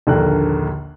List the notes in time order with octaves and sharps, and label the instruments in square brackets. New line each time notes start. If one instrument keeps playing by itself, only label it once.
[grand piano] A#1 D#2 D3 A#4 F#6